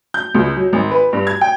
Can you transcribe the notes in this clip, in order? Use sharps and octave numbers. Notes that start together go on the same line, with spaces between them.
G6
C#2
F#3
G#1
B4
G2
G#6
G5